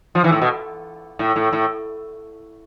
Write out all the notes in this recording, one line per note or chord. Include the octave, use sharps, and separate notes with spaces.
F3
E3
A2
B2
A2
A2
A2